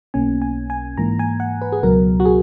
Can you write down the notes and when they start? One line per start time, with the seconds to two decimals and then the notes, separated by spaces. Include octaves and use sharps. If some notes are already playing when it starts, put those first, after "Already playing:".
0.14 B1 B2 A#3 C#4 G#5
0.42 G#5
0.70 G#5
0.97 G#2 E3 A#3 A#5
1.19 G#5
1.40 F#5
1.62 B4
1.72 G#4
1.83 C#2 B2 F#3 A#4
2.20 F#4
2.25 G#4